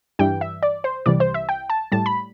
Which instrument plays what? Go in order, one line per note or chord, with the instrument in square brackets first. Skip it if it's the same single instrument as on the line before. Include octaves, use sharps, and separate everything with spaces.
[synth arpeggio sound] G2 E3 G3 G5
E5
D5
C5
C2 C3 E3 G3 D5
C5
E5
G5
A5
A2 G3 A5
B5